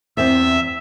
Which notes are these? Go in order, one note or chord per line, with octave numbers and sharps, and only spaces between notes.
E2 C4 E5